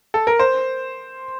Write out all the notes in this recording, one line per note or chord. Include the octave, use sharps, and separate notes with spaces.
A4
A#4
C5